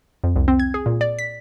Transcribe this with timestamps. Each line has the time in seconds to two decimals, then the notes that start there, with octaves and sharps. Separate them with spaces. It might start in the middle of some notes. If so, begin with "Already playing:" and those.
0.24 F2
0.36 C2
0.48 C4
0.60 G#6
0.74 G#4
0.86 A#2
1.01 D5
1.19 B6